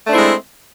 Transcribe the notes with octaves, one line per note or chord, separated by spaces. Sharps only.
G#3 A3 C4 D4 E4